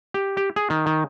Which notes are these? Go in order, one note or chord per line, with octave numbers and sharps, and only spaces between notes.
G4
G4
G#4
D#3
D#3